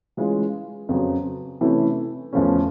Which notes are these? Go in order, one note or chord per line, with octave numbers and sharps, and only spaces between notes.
E3 G#3 C#4 F4 G#4
F2 C#3 F#3 B3
C3 E3 A3 C#4 E4
E2 C#3 F3 A3 C#4